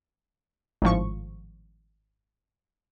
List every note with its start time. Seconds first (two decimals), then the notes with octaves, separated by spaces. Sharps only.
0.82 G#1 A2 F3 C#6